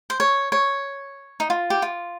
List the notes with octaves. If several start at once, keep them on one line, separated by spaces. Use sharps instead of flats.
C5
C#5
C#5
D#4
F4
G4
F4